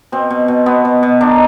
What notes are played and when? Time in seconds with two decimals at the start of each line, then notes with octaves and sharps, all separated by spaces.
0.12 B2 C4
0.30 B2
0.48 B2
0.66 B2 B3
0.85 B2
1.03 B2
1.21 D#3 D4